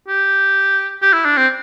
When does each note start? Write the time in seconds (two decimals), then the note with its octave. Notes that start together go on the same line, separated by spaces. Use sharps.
0.08 G4
1.02 G4
1.13 E4
1.25 D4
1.37 C4